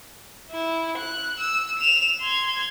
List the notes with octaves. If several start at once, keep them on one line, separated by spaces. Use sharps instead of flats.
E4
F#6
E6
E7 F7
C6 G#6